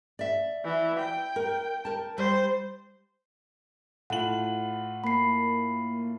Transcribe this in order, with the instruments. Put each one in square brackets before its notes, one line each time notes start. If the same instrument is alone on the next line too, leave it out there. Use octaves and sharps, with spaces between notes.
[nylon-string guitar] D5 E5
[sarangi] E3
G5
[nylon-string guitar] A#4
A#4 A5
[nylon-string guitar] G3 [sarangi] C5
[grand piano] A2 F4 F#7 [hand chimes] F#5
[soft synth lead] A#3 [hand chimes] B5 C7